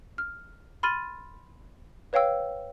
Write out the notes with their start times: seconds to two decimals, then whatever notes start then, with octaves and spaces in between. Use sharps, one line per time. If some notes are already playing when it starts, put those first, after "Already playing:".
0.18 F6
0.83 B5 C6 F6 A6 D#7
2.13 B4 C#5 F5 G5 E6